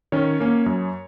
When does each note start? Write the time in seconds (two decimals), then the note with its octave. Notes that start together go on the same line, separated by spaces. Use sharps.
0.12 D#3 C#4 C#5
0.40 A#3 C#4
0.66 F#2